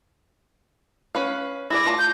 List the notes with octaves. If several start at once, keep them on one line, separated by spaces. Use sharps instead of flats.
C#4 B4 F5
E4 G#4 D5 A#6
A3 F4 A5
G6